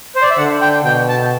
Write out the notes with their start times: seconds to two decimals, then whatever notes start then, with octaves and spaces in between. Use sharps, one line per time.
0.16 C5
0.22 D5
0.30 E5
0.38 D3 F#5
0.61 G5
0.85 B2 G5
1.08 A5